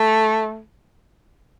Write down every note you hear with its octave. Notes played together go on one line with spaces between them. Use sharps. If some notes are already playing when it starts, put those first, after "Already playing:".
Already playing: A3